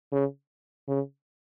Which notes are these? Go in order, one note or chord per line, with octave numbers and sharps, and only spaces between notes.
C#3
C#3